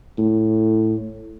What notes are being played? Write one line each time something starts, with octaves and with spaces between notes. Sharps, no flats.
A2